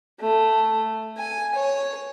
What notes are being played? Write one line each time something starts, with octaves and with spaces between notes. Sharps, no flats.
A3
G#5
C#5